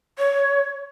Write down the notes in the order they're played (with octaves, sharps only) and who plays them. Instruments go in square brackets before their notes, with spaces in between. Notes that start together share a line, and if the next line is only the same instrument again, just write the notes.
[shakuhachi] C#5